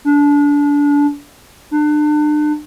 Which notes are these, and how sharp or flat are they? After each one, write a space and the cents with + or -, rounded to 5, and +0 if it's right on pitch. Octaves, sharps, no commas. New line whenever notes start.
D4 -25
D4 +35